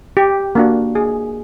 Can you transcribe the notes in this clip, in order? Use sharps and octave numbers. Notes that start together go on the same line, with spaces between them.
G4
A#3 D4 F#4
G#4